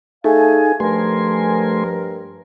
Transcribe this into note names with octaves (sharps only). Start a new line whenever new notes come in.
A3 D#4 G#4 A4 F5 G#5
G2 F3 A3 A#4 G#5 C6